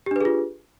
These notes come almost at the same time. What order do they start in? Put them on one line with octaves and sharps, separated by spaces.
G4 D4 B4 G#4 F4